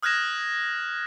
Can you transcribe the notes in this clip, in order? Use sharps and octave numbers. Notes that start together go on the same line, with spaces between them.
D#6 F6 F#6 G#6 A#6 E7